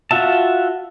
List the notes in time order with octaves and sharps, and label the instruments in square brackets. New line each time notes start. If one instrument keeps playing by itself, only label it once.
[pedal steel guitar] F4 F#4 E5 A5